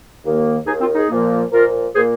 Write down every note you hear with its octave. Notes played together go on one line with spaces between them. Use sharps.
D#2 D#3 A#3
D#2 D#3 A#3 D#4 G#4
C4 F4
D#4 G#4
A#2 F3 A#3
A#2 F3 A#3 F4 A#4
A#2 A#3 G#4 C5